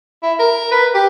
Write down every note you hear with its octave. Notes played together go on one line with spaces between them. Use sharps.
E4
A#4
B4
G4